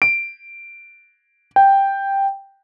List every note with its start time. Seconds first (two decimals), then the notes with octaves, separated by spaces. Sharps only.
0.02 D7
1.56 G5